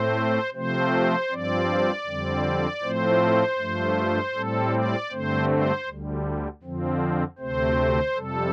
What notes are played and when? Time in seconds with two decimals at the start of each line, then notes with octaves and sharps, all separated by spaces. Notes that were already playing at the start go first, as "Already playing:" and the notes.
Already playing: A2 A3 C4 C5
0.54 C3 F3 A3 C4 C5
1.30 G2 F3 C4 D5
2.06 F2 D3 G3 C4
2.82 A2 F3 A3 C4 C5
3.59 G2 F3 A3
4.34 A2 G3 C4 A4
4.73 D5
5.11 G2 D3 A3 C4 C5
5.49 C5
5.86 D2 D3 G3
6.63 F2 D3 F3 C4
7.38 D2 C3 A3 C4 C5
8.15 F2 C3 G3 A4